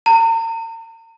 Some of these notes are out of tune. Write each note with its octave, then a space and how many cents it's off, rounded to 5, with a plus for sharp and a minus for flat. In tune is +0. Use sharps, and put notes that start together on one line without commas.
A#5 -40